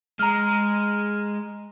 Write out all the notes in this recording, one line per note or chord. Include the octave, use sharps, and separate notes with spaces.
G#3 A#5 F6